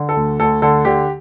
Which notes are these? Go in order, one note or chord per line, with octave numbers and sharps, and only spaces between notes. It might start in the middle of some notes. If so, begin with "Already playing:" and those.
Already playing: D3
A4
D2
D2 A4
D3 A4
D3 G4